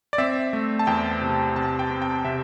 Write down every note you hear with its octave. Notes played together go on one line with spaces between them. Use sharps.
D5
C4 E5
A3
A5
E2 G5
C3
C3 A5
G5
C4
G5
C3 E5